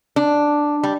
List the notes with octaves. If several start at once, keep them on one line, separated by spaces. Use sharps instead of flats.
D4
G3